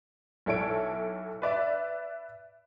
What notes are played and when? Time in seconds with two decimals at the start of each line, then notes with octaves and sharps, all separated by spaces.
0.46 B1 E4 A4 C#5 D7
1.42 B4 D5 E5